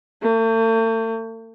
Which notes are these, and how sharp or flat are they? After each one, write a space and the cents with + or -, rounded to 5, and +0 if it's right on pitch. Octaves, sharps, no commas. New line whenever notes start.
A3 +40